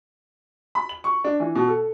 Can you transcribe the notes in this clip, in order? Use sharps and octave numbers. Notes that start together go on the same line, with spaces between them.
B5
F#7
C#6
D4
E3
B2
A4